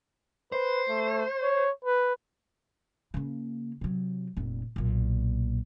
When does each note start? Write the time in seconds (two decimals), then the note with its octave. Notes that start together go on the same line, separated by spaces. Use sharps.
0.52 B4 C5
0.89 A3
1.42 C#5
1.85 B4
3.14 C#3 A#3
3.81 C3 F#3
4.37 F1 A#2
4.76 B1 A#2